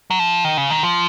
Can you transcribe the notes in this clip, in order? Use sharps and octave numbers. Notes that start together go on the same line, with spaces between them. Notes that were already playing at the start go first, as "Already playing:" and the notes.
F#3
F3
D#3
C#3
D#3
F3